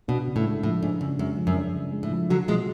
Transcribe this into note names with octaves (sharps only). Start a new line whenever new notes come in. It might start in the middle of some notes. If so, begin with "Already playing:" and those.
B2 D4
C#3
A2
G#3
A2 F3
G#2 D4
F#2 C#3
F#2 G#3
F3
F#2
D4
C#3
G#3
A2
F3
D3 F#3 F#4
B2 F3 G#3